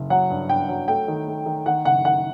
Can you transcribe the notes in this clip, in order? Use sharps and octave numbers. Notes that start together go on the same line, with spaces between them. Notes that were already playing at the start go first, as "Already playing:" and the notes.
Already playing: F#1
F#3 F#5
G2
G2 G5
F#3
A3 G5
D#3
A3
D#3
D#3 F#5
F#1 F#5
D#3 F#5